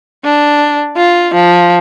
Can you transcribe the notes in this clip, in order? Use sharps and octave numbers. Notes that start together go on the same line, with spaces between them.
D4
F4
F3